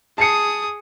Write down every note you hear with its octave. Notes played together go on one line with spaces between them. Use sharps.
G#4 A5 D#6 C7 C#7